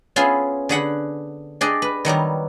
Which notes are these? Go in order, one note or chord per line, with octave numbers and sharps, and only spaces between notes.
B3 C#4 F4 G#4 E5 B5
D3 G#4 F#5 B5
D4 G4 G#4 D5 D#5
B4
D#3 F#3 G3 B3